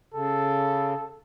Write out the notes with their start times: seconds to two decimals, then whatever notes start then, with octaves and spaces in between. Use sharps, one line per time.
0.14 C#3 A4